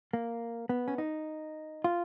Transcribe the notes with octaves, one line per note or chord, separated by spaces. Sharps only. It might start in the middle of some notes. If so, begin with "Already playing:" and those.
A#3
B3
C#4
D#4
F4